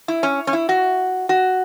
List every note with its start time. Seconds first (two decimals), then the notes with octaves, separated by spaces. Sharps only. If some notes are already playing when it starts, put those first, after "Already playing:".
0.08 E4
0.23 C#4
0.47 C#4
0.53 E4
0.69 F#4
1.29 F#4